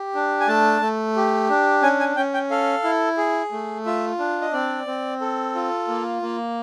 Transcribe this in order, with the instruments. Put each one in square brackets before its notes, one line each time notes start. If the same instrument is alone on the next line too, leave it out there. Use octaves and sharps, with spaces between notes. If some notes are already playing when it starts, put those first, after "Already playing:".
Already playing: [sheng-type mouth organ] G4
D4
G#5
A3 A5
A3
G4
D4
C#4 G#5
G#5
C#4 G5
G5
A4 F5
E4
G#4
A3
F4 E5
D4
D#5
C4 D5
C4
A4
F4
A#3
A#3